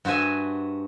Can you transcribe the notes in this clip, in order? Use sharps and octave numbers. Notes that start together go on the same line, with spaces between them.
G2 F#4 C5 E5 G#5